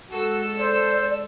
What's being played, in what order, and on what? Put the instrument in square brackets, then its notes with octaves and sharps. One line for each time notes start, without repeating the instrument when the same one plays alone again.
[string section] G#3 A4 E6 [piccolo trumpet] F#4
[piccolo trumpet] C5 [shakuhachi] D5